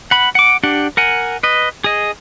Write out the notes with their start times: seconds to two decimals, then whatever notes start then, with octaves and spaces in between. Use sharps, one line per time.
0.11 F#5 B5
0.35 F#5 D6
0.63 D4 G4 F#5
0.97 A#4 F#5 G#5
1.43 B4 D#5
1.84 G#4 D#5